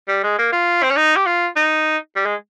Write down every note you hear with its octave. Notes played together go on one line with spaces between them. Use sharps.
G3
G#3
A#3
F4
C4
C#4
D#4
G4
F4
D#4
G3
G#3